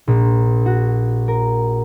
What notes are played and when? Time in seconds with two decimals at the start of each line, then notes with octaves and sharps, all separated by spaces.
0.07 A#1
0.66 F#4
1.28 A#4